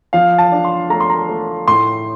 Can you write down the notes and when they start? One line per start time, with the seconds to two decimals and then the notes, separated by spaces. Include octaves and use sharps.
0.13 F3 F5
0.38 A5
0.52 D4
0.65 C6
0.90 A3 A#5
1.00 C6
1.10 A#5
1.29 A3
1.68 A2 C6